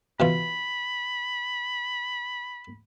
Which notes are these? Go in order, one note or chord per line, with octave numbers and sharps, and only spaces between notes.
B2 E3 F4 B5